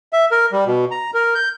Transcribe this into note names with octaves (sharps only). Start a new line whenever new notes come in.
E5
A#4
G3
B2
A#5
A#4
G6